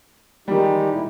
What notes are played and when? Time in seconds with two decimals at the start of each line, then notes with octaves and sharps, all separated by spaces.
0.48 D#3 G3 G#3 D#4 G4
0.91 A#2 E4